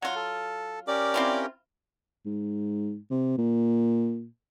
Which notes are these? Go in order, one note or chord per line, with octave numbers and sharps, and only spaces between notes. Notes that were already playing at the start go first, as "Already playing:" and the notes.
F#3 F4 F#5
A4
C#4 G4 A#4 D5
C4 E4 F4
G#2
C3
A#2